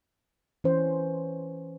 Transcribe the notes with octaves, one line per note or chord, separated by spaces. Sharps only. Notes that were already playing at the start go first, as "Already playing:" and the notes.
E3 C#4 C5